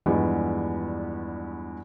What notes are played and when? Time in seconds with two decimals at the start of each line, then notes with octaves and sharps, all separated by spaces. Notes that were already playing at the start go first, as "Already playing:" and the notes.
0.06 E2 G2 F3 G3 G#3 B3